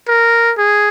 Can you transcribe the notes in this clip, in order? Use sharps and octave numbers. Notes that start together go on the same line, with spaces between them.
A#4
G#4